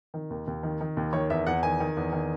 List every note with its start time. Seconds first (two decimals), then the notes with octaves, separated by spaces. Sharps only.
0.14 D#3
0.30 D#2
0.47 D#2
0.63 D#3
0.81 D#3
0.97 D#2
1.13 D#3 C#5
1.30 E2 E5
1.47 E2 F#5
1.63 D#3 G#5
1.80 D#3
1.97 E2
2.13 D#3